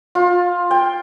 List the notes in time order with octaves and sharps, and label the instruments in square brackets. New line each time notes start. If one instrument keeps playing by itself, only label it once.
[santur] F4
G5